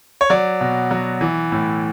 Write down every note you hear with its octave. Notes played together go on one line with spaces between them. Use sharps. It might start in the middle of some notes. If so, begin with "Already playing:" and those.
C#5
F#3 D5
B2
F#3
E3
A2